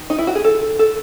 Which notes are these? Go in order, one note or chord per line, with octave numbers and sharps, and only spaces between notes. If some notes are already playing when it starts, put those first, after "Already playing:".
Already playing: D#3
D#4
E4
F#4
G#4
A4
A4